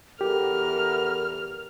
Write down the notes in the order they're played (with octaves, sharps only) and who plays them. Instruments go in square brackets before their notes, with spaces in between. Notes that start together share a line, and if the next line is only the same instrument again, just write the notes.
[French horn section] E2 A4 [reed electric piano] G4 [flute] A#4 [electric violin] F6